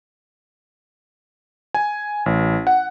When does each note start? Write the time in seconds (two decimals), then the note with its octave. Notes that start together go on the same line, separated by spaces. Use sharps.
1.74 G#5
2.26 A1
2.67 F#5